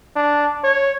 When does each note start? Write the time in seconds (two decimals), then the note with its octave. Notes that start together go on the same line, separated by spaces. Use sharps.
0.16 D4
0.64 C#5